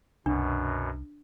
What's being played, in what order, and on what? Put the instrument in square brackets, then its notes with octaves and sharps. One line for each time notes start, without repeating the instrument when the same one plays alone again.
[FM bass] C2 [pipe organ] F#2 B2 [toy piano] D4